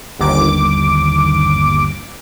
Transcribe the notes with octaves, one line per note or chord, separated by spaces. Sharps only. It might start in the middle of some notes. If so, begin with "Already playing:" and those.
G1 D#2 D6